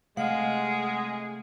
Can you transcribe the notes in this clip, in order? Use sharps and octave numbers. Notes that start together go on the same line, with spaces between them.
C3 G#3 A3 G#4 F5 F#5